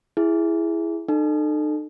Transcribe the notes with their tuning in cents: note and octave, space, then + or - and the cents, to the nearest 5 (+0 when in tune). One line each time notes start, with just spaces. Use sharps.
E4 +10 G#4 +0
D#4 -40 A4 +0